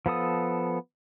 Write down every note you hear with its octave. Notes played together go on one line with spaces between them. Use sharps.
F3 B3 A4 D#6